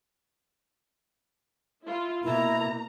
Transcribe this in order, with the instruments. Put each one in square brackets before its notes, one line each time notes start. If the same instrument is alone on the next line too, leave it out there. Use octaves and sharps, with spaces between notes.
[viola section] E4 F4
[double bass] B2 [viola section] A#3 A#5 [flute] E4